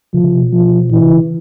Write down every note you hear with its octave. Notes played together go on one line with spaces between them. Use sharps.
C#3 F3
C#3
C3
B2
F3
A#2 E3
C3
C#3